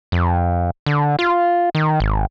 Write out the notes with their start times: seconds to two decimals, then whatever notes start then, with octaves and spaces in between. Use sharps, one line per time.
0.12 F2
0.86 D3
1.19 F4
1.75 D#3
2.00 G#1